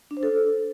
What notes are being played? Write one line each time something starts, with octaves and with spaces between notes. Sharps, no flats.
D4
C5
A4